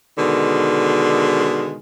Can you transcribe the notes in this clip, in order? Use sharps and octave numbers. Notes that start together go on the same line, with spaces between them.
B2 D3 D#3 G#3